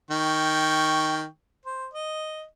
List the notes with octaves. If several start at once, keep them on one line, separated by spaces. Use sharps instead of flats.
D#3 G5 C#6
C5
D#5